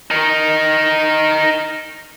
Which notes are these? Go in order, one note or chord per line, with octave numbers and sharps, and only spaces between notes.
D#4 A#4